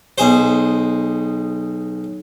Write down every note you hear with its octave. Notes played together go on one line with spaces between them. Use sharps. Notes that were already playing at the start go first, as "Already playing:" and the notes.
B1 G#4 C5